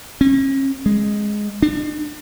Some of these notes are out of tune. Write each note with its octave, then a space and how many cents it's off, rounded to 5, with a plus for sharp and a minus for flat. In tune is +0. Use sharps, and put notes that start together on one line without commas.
C#4 -40
G#3 +0
D4 +35